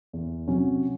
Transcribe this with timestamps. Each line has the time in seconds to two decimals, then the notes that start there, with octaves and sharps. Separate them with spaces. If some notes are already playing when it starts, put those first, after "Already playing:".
0.13 E2
0.47 C3 F#3 C#4